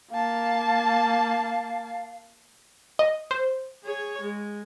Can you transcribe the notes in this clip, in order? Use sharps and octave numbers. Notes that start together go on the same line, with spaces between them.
A#3 F5 A5
D#5
C5
G#4 C#5
G#3